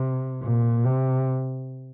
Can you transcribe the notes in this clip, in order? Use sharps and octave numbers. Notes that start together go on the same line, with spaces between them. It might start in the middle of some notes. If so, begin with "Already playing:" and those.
Already playing: C3
A#2
C3